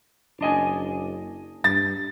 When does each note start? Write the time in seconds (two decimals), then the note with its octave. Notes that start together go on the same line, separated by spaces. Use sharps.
0.41 F#1 D4 D#5 G#5
1.64 G2 A6